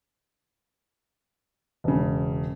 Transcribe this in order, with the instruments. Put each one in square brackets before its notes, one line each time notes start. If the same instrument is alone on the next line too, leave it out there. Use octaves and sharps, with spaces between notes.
[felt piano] E1 C#3